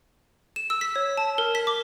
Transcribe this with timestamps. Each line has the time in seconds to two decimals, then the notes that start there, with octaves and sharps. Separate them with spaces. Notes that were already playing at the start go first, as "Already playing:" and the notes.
0.56 E7
0.70 E6
0.81 B6
0.96 C#5
1.17 A5
1.38 A#4
1.55 B6
1.67 D6